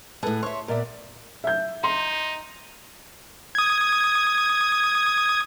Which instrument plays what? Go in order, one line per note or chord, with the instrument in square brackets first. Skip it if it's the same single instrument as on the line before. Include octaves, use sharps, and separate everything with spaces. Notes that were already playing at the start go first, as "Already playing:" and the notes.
[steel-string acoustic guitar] A2 G#4 [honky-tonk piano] A4 B4
[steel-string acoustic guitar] C#5 E5 [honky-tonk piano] C6
[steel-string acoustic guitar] A#2 B3 [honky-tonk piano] A#4 D5 E5
[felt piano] E5 G6
[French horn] D#4 [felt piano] C6
[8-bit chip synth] D#6 G#6